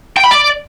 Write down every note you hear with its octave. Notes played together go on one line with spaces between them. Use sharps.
G5
B5
D5